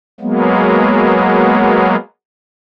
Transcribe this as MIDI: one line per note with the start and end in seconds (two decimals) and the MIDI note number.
0.21 1.96 54
0.21 1.96 56
0.21 1.96 58
0.21 1.96 59